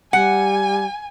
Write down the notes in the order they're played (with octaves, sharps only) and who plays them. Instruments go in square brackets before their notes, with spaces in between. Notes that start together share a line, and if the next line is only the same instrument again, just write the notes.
[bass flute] G3 [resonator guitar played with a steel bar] F#5 [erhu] G#5